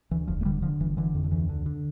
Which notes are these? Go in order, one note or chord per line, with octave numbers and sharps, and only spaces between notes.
D2 E3
E1 F3
A3
D3 G3
D3 F3
G1 E3
D3 E3
F2
D3
D2 E3
D3
D3